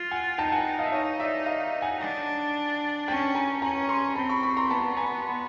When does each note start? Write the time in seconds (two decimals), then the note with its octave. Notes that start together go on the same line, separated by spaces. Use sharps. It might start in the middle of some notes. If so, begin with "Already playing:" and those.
Already playing: F4
0.11 F#5 G#5
0.38 D#4 G5 A5
0.52 F#5 G#5
0.79 D#5 F5
0.86 E5
0.92 D#4 C#5 D#5
1.20 D5 E5
1.46 D#5 F5
1.82 F#5 G#5
2.00 D4
3.08 C#4 G5 A5
3.35 G#5 A#5
3.62 C#4 G#5 A#5
3.89 A#5 C6
4.16 C4 A5 B5
4.29 B5 C#6
4.43 B5 C#6
4.57 A#5 C6
4.70 B3 A5 B5
4.97 G#5 A#5